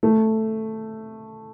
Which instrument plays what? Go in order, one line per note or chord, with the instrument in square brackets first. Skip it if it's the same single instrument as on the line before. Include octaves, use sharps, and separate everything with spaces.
[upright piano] A3